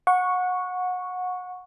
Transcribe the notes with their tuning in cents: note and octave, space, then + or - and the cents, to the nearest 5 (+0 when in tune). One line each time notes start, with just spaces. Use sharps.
F#5 -25 C#6 +0